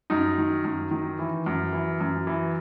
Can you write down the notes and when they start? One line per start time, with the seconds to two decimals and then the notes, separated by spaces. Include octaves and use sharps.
0.10 F#2 D#4
0.38 D#3
0.65 F#2
0.91 D#3
1.19 E3
1.46 F#2
1.73 E3
2.00 F#2
2.27 E3